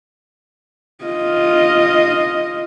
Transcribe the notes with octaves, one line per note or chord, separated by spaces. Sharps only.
F4 D#5